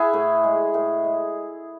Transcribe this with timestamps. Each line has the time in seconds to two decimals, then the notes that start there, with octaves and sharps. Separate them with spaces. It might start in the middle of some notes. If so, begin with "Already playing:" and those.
Already playing: E4 G#4 F#5
0.13 A2
0.44 G#3
0.74 A2
1.04 G#3